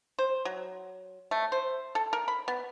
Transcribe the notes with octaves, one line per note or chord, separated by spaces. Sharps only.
C5
F#3
A3
C5
A4
A#4
B5
B3